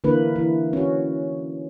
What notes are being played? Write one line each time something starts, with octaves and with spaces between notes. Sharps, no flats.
D3 E3 A#3 B4
E3
C#4 F#4